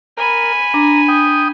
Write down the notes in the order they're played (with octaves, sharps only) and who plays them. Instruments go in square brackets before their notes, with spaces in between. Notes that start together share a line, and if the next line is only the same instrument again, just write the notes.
[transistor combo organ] A#4 [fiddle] G#5 B5
[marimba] D4 [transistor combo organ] A#5
[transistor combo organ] G5 D#6